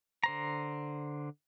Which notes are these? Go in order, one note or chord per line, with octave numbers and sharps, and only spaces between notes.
D3 C5 A#5